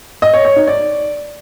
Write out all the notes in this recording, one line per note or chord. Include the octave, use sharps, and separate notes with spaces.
D#5
C#5
C#5
D#4
D5